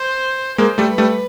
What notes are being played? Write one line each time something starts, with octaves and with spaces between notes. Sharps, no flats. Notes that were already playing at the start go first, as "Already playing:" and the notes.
Already playing: C5
G#3 A#3 C5
G3 A3
B4
G3 A3